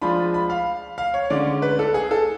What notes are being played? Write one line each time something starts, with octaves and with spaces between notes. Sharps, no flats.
F3 G#3 D4 F4 B5
B5
F5
F5
C#5
D3 G#3 C#4 D5
B4
A4
G#4
A4